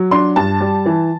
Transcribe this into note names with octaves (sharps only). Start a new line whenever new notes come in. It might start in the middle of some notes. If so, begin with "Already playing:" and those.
Already playing: F#3
D4 C6
G2 A5
G3
E3